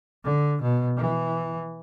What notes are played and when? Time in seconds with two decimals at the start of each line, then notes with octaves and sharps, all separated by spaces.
0.24 D3
0.62 B2
0.97 E3